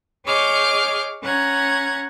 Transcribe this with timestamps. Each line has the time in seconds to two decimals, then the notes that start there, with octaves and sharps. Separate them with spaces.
0.25 G#4 C#5 D#5 D6 F6 G6
1.22 C#4 F#5 A#5 G#6